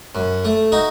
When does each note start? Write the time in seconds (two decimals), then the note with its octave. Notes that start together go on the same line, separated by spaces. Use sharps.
0.15 F#2
0.45 A3
0.72 D#4 F#4